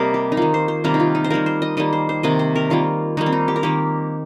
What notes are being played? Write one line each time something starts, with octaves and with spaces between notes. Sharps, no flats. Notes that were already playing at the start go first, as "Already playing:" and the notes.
Already playing: C3 G3 A#3 A#4 C5 D#5
G4
D#4
D#3 A#3 F4
C5
C5
C3 D#3 G3 A#3 A#4
D#4
F4
D#4
C5
D#3 G3 A#3 A#4
C5
D#5
D#3 G3 A#3 D#5
C5
C5
C3 D#3 A#3 D#5
C5
A#4
D#3 G3 A#3 F4
D#3 G3 A#3 D#4
C4
D#4
G4
A#4
D#3 A#3 G4